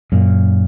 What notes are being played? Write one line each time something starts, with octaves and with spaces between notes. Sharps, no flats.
F#2 A#2